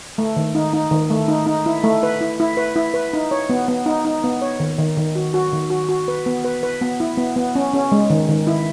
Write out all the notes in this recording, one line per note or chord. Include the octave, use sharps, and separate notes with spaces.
A3
D#3
D#4
D#4
D#3
A3
D#4
D#4
E4
A3
B4
E4
E4
B4
E4
B4
D#4
C#5
B3
B3
D#4
D#4
B3
C#5
D#3
D#3
D#3
F#4
F#4
D#3
F#4
F#4
B4
B3
B4
B4
B3
E4
B3
B3
C#4
C#4
G#3
D#3
D#3
E4